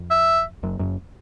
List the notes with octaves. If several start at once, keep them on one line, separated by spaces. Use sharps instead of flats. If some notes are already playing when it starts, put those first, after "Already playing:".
Already playing: F2
E5
F#1 F#2
F#1 F#2